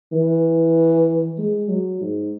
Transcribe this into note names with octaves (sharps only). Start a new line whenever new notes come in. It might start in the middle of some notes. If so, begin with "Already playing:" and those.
E3
G#3
F#3
G#2